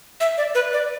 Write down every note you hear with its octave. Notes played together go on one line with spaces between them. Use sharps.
E5
D5
B4
D5